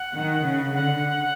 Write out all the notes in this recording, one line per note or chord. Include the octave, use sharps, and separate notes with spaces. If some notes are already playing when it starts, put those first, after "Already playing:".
Already playing: F#5
D#3
C#3
D3 F#5